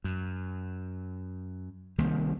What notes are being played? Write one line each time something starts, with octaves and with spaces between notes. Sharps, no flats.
F#2
C2 D#3 A#3